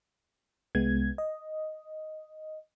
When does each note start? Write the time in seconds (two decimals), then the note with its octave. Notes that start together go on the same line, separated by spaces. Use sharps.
0.75 C2 G#3 B3 G#6
1.18 D#5